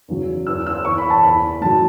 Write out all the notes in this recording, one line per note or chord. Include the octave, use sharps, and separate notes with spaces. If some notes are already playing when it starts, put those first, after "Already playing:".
E2 C#3 F#3
E2 E3 E6
E6
E2 E3 C#6
B5
A5
E2 E3 B5
A2 F#3 A5